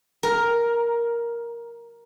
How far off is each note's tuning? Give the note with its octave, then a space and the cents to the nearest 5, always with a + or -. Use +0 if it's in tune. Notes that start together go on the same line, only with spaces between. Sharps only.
A#4 +5